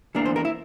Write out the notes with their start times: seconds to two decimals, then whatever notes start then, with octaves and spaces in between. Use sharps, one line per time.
0.15 E2 E3 A#3 D4 A#4
0.26 C5
0.36 A#4
0.45 E4